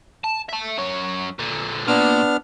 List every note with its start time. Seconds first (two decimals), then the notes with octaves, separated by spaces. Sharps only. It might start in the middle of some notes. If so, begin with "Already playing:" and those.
0.24 A5
0.49 E5 A5
0.78 F#2 C#5
1.39 A#2 D3
1.87 A#2 B3 D4 F6